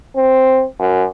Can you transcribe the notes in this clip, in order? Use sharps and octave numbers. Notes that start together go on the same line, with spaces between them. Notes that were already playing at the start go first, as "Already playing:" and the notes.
C4
F#2